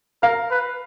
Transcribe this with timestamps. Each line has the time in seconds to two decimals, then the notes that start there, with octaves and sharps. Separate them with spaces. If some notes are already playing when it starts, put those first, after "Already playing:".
0.23 A#4 F5
0.51 B4